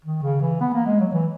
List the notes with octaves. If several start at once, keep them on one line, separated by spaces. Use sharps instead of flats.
D#3
C#3
E3
B3
A#3
G#3
F#3
E3